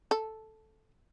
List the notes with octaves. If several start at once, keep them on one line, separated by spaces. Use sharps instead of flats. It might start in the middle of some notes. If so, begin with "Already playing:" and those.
A4